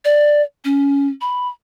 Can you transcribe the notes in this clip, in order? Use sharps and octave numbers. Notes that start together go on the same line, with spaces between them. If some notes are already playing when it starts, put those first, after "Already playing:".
D5
C#4
B5